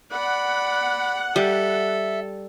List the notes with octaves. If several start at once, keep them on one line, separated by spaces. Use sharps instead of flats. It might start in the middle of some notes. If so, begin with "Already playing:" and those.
D5 F#5 B5
G3 A4 E5